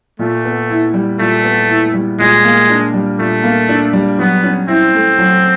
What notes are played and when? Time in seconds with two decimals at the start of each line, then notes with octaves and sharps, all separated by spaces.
0.19 A#2 A3
0.45 B3
0.70 E4
0.94 G3
1.19 A#2 A3
1.44 B3
1.69 E4
1.94 G3
2.19 A#2 G#3
2.44 A#3
2.69 D4
2.94 G3
3.19 A#2 A3
3.43 A#3
3.69 D4
3.93 G3
4.18 F#3 B3
4.43 C#4
4.68 C4 E4
4.94 A3
5.19 F#3